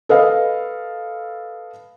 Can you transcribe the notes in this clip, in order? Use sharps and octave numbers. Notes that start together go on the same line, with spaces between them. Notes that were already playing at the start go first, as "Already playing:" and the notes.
A4 B4 D#5 F5